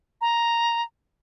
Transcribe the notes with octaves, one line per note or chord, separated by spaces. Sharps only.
A#5